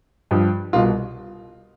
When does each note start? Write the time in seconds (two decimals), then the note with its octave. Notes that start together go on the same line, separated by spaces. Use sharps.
0.31 G2 F3
0.73 C2 B2 F4